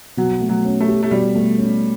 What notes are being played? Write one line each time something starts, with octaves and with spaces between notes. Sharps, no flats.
B2 F#3
A3
F#3
C#4
A3
G4
A3
B2 G3
A3
C#4